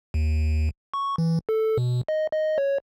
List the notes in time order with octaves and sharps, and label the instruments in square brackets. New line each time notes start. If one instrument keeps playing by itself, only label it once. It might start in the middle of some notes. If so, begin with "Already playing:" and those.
[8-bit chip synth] D#2
C#6
E3
A4
B2
D#5
D#5
C#5